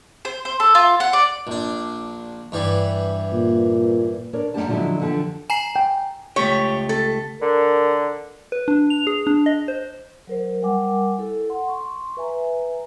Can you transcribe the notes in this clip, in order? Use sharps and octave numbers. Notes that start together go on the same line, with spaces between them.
C5
C5
A4
F4
F#5
D5
A#1 D4
G2 E3 G3
A#2
D4 A#4 C#5 D5
F#2 B2 A3 D4 G4 A5
D3 F3 F#3 G#3 C#4 E4
F#2 D3 E3 F3 G4 A5
G#5 A#5 C7
G5
C#2 A3 G4 C#5
A4
D3 A#4
B4
D4
F7
G#4
D4
D#5
C5
F#3 A#4 C5
G3 A#4 F#5 G#5 D6
E4 A4
F#5 C6
C6 C#6
B4 E5 G#5 A#5